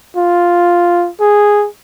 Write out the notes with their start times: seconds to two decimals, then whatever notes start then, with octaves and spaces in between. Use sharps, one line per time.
0.16 F4
1.20 G#4